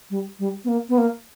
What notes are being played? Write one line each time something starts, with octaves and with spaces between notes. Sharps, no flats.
G3
G3
B3
A#3
B3
A#3